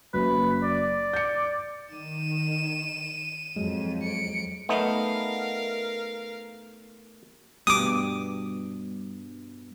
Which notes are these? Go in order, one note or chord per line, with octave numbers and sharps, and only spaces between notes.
F#1 F#2 B4
D5
G6 C#7
D#3 D#7 E7
F2 F#3 G#3
C#7 D7
A3 B3 D#4 A#4 F5
G2 B2 D6 D#6